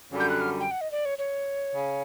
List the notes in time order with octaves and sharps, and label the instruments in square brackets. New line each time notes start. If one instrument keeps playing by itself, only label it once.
[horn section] F#2 D3 G3
[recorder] G6
F#6
F6
G5
F#5
D#5
D5
C#5
C#5
[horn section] C#3